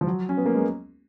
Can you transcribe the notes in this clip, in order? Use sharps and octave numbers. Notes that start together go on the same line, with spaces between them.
F3
F#3
C#4
B3
A#3
G#3